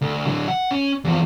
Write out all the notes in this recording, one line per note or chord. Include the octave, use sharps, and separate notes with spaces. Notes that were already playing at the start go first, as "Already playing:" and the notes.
D2
D3 F#3
F#5
C#4
E2 F3